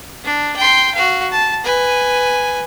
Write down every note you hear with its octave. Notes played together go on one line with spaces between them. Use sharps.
D4
G5 C6
F#4 F5
A5
B4 G#5